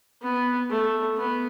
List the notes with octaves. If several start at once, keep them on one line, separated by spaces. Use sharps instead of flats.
B3
A3
B3